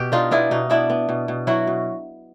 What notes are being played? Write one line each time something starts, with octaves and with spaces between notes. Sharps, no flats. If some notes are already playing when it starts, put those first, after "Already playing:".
Already playing: B2 G4
D4 D#4 F4
B3 D4 E4
B2 D#4
B3 D4 E4
B3
B2
B2
F#3 E4 F#4
B2